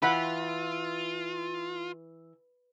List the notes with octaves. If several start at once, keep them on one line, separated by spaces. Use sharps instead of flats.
E3 F4 F#5 B5